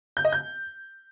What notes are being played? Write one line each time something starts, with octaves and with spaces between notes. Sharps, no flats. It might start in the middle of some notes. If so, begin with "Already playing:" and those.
G6
D#5
G6